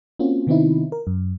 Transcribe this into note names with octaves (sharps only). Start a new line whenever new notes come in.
A#3 C4 C#4 F4 F#4
C3 D#3 B3 C4 D#4 E4
A#4
F#2